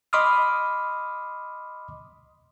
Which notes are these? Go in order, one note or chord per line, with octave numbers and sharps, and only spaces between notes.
D#5 B5 C6 D6 D#6 F6